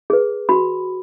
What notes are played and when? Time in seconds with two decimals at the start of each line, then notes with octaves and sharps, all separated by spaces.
0.10 G#4 B4
0.49 F#4 B5